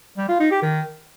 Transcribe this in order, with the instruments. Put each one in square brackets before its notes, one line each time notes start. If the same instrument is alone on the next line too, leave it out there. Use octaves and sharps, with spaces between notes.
[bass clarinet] G3
F4
D#4
G4
D#3